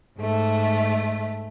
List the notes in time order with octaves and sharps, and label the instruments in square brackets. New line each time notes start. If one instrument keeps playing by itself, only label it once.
[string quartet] G#2 A3